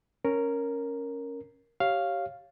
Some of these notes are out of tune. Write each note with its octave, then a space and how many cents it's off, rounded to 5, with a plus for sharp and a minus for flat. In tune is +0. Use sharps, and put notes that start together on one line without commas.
C#4 -5 A#4 +0
G4 -20 C#5 -5 F5 +0